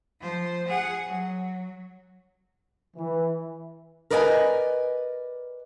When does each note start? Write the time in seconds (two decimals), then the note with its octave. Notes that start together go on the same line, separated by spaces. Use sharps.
0.20 F3 C5
0.67 G#4 F#5
1.05 F#3
2.97 E3
4.10 A#4 B4 D5 D#5 G5 G#5